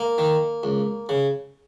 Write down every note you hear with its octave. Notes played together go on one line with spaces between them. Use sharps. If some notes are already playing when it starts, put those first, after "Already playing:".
Already playing: A#3
D#3
C#2
C#3